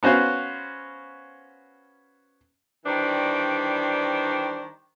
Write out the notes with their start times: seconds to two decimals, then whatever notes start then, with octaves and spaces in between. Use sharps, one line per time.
0.03 B3 C#4 F#4 C5 F5
2.85 D#3 E3 G3 D4 C5